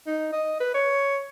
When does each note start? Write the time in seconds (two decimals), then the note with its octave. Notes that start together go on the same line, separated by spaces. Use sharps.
0.07 D#4
0.33 D#5
0.60 B4
0.74 C#5